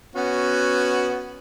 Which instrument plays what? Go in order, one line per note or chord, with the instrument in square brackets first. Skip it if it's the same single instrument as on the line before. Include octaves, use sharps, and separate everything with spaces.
[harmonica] B3 C#4 F#4